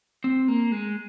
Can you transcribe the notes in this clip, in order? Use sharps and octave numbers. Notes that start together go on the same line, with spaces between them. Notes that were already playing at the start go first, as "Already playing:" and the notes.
C4
A#3
G#3